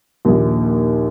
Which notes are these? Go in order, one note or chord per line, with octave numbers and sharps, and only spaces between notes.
A#1 D#2